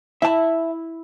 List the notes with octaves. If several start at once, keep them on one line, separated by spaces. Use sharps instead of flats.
E4 E5 A5